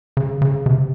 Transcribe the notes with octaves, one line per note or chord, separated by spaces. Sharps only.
C#3
C#3
C3